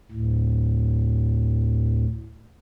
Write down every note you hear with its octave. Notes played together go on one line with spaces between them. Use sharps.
D2 A2